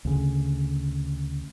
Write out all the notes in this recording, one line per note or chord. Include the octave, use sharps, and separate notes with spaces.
D2 C#3